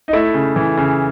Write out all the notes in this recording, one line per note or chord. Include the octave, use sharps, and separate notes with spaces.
D#4
A3 E4
C#3
E3
C#3